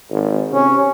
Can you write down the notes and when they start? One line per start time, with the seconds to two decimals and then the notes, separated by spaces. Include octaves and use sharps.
0.11 G#1
0.52 C3 C#4